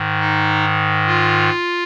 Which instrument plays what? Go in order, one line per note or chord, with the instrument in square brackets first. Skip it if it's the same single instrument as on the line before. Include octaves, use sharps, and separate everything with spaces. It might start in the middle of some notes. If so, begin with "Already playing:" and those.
Already playing: [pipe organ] G#2 D#3
D#4
F4